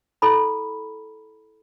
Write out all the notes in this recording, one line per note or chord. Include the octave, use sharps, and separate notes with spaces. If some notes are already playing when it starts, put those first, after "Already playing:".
E4 A4 A#5 B5